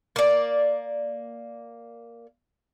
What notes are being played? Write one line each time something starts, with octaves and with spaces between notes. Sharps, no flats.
A#3 D5